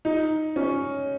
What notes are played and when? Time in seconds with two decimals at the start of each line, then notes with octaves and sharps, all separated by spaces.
0.05 D#4
0.56 C#4